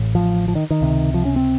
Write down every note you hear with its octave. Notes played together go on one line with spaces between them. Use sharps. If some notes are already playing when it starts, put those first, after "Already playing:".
Already playing: A1 A2
F3
F3
D#3
D#3
C#2 C3
F3
C#4
C4